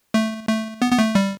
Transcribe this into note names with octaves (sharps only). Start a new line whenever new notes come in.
A3
A3
B3
B3
A3
G3